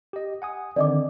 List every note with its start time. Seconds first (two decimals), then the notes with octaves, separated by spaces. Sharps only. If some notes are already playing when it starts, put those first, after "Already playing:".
0.13 G4 D#5
0.42 F#5 G#5 D#6
0.76 D3 D#3 C4 D5 D#5 D6